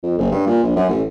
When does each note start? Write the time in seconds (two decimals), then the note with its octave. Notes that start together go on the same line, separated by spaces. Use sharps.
0.03 F2
0.18 F#1
0.32 G2
0.47 A#2
0.63 A#1
0.76 F#2
0.89 A1